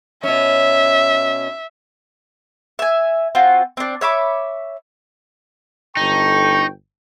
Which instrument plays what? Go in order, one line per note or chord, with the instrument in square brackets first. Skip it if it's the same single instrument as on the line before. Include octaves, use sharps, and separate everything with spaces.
[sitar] B2 C#4 [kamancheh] E5
[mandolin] E5 G#5
C4 F4 F#4
C4 D4
C#5 E5 B5 D6
[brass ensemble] G1 A4 G5 [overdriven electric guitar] D#4 [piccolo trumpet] C#6